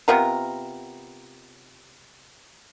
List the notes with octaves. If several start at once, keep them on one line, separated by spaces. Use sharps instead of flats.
C3 B3 F4 A#4